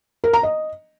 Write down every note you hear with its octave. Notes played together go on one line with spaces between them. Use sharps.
A#4
A#5
D#5